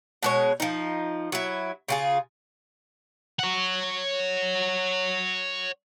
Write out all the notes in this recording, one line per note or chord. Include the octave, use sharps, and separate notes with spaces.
B2 G#3 C#5
F3 D#4
F#3 E4
C#3 F4 G#4
C#5 F#5